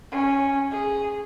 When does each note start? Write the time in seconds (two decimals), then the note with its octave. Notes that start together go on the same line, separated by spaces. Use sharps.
0.11 C#4
0.71 G#4